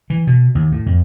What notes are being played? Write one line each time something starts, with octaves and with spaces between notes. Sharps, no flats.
E3
B2
D#2
A2
F2